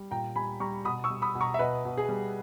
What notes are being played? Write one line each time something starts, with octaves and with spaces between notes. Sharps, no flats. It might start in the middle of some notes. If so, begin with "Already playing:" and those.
Already playing: G3
A#2 G5 A#5
G3 G#5 B5
G3 A#5 C#6
B2 B5 D#6
C#6 E6
G3
B5 D#6
B2
A#5 C#6
E5
B2 B4 D#5
B2
G#4
G3